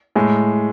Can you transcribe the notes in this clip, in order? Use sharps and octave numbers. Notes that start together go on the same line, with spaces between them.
A2 G#3